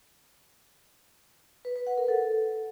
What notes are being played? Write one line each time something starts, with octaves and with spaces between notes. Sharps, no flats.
B4
B4
F#5
A#4
A4